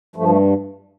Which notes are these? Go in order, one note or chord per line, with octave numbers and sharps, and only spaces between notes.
G2 F3 A3
A3